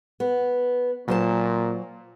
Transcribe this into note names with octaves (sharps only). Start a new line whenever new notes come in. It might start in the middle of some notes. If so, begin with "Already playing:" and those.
B3
A#2 F#3 C5 A5